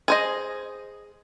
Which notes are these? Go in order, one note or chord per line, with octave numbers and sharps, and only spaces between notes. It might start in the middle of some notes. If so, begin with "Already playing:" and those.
G#4 C5 D#5